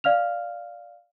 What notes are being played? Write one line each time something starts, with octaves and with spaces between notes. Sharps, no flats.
D5 F5 F6 F7